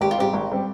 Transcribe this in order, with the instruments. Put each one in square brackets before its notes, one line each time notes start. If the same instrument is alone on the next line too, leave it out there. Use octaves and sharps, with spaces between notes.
[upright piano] G#1 [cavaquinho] G4
[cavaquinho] F4
[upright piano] G#2 G3 C4 [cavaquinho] G4
[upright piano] G#1
G3 C4